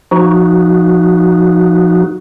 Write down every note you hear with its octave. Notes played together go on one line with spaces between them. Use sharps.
F3 D#4 F#4